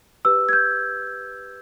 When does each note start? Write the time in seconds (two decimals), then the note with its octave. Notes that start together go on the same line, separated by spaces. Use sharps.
0.25 G4 B4 E6
0.49 G#6
0.53 G6